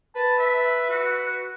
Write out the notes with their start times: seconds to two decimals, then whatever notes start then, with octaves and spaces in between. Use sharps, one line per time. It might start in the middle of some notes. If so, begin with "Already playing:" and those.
0.16 B4 A5
0.39 E5
0.90 F#4